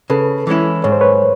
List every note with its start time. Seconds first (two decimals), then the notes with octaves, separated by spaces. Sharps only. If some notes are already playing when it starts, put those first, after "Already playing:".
0.10 C#3 A4 B4
0.47 E3 G#3 C#4 E4
0.84 G#2 C#5
0.92 C5
1.01 B4 C#5